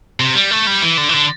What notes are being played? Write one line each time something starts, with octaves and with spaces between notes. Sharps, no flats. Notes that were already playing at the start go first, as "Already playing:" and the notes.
C3
G3
A3
G3
E3
D3
E3
D3